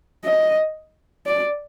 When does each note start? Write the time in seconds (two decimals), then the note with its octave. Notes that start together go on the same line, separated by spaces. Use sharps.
0.24 D#5
1.26 D5